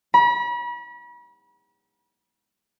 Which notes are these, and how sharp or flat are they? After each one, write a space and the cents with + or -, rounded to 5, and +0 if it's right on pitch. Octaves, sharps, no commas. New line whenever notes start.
B5 -40